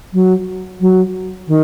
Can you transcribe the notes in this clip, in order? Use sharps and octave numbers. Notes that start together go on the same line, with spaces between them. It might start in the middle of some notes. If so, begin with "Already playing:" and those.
F#3
F#3
D#3